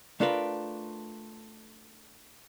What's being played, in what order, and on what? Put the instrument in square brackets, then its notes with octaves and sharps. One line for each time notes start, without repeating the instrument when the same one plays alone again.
[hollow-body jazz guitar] A3 D4 F4 A#4 B4